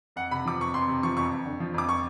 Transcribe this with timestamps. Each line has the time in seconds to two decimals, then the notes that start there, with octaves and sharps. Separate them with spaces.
0.16 F2 F#5
0.31 C3 B5
0.46 F3 D6
0.59 F2 C#6
0.74 F2 C6
0.88 C3
1.03 F3 C#6
1.17 F2 C#6
1.31 F2
1.45 D3
1.60 F3
1.74 F2 D6
1.89 C#6